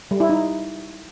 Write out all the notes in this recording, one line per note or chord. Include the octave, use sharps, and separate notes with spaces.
G3
E4
D#4